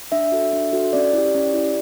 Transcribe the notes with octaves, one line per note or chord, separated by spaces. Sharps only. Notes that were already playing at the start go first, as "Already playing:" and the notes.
D4 E5
F#4 A4
D4
F#4 A4
C#4 D5
E4 G4
C#4
E4 G4